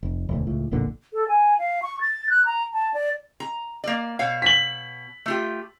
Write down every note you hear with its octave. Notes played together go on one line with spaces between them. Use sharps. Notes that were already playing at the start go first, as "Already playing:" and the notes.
F1
E1 D2
C#2 A2
F1 B1 A#2 D3
A4
G#5
F5
C#6
A6
F#6
A#5
A5
D5
A#5
A#3 D5
B2 C#5 F5
B6 F#7
A3 F4 G4